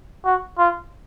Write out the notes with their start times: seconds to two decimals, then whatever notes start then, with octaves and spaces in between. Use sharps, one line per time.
0.25 F#4
0.58 F4